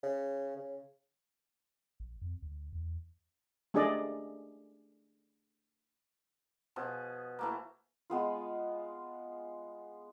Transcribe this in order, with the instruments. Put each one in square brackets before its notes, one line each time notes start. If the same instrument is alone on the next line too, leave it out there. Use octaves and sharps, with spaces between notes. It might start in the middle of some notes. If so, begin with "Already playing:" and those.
[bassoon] C#3
C#3
[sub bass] A#1
F2
D2
E2
[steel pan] A3 D4 G4 G#4 D5 D#5
[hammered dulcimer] B2 F3 G#4
E3 A3 A#3
[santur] G#3 B3 F4